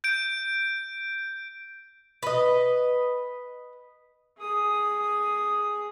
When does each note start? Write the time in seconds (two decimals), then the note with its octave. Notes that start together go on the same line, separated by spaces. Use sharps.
0.04 G6 D7
2.23 B4 D#5
4.40 G#4 D#6